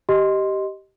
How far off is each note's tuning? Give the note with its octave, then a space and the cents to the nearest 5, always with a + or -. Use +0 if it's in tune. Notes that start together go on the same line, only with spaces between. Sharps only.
G4 -15 D#5 +0 C6 +0